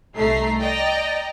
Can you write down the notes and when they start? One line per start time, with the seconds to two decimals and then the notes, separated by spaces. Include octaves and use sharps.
0.15 C2 A3 D#4 E5 A#5 C7
0.59 D5 D#5 G5 A#5